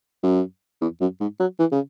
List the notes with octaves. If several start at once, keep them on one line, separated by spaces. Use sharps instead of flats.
F#2
E2
F#2
G#2
F#3
E3
C#3